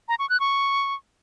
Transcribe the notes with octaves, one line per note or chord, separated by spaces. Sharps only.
A#5
C#6
F#6
C#6